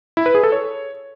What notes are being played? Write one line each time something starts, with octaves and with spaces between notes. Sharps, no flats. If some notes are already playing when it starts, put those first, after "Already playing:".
E4
B4
G#4
A4
C#5